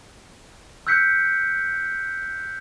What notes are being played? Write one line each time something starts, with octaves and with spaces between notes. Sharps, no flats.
E6 F#6 G6 B6 C#7